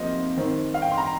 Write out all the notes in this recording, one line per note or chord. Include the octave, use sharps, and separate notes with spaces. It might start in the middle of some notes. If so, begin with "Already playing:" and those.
Already playing: C3 F3 A#3 C5 D#5
D#3 C4
F5
G5
C6
A#5